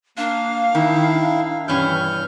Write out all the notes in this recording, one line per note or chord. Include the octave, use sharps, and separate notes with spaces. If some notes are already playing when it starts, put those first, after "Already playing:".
A#3 D4 F5
D#3 E4
G2 B2 E3 C#4 F6 G6